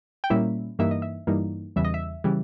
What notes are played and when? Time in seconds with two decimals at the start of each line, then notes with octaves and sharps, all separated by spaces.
0.24 G5
0.30 A#2 G3 A#3 C#4 E4 E5
0.79 G2 E3 G3 A#3 D#4 E5
0.91 D#5
1.02 E5
1.27 G2 E3 G3 A#3 D#4
1.76 E2 C#3 E3 G3 E5
1.85 D#5
1.94 E5
2.24 C#3 E3 G3